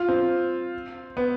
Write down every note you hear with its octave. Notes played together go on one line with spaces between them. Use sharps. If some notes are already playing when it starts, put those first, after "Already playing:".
Already playing: F4
C4
B3